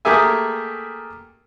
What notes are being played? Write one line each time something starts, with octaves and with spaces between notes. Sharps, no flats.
A3 A#3 G4 G#4 E5 G#5